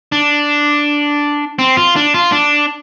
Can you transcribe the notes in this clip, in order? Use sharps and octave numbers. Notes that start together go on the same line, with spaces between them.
D4
C4
F4
D4
F4
D4